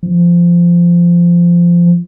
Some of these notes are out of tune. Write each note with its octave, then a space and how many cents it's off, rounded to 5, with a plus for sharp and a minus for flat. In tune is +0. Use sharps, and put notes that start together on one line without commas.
F3 -15